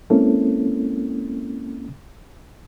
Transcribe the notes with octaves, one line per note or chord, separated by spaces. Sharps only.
G#3 A#3 C4 C#4 E4 A4